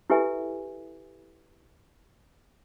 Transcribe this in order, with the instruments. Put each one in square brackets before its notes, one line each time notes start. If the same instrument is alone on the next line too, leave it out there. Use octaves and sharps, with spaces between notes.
[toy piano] E4 G4 A4 B4 E5 G#5